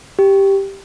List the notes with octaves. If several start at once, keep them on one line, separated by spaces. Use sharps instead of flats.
G4